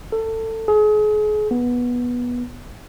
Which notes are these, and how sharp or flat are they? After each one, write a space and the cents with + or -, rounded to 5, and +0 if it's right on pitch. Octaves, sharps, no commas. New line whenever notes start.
A4 +20
G#4 +35
B3 -15